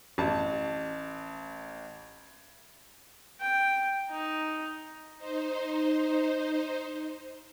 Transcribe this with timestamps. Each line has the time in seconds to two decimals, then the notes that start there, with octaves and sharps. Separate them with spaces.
0.18 A1 A5
3.41 G5
4.10 D#4
5.17 D#4 C5